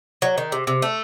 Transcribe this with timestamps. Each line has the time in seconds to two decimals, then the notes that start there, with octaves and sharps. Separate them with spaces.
0.22 F#3
0.38 D#3
0.52 C3
0.67 C3
0.82 A3